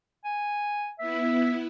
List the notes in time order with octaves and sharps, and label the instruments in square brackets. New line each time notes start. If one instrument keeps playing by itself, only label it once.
[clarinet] G#5
[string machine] B3 E4 [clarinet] E5